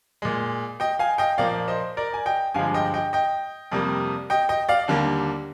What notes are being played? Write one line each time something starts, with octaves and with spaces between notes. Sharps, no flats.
A#2 G#3
D#5 G5
F5 G#5
D#5 G5
A#2 F3 A#3 D5 F5
C5 D#5
A#4 D5
G#5
D#5 G5
G2 D3 F3 G#3 F5 G#5
D#5 G5
D#5 G5
D#5 G5
F2 C3 G3 A#3
D#5 G5
D#5 G5
D5 F5
D#2 D3 G3 A#3